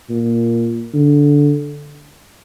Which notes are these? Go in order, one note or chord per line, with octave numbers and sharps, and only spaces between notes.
A#2
D3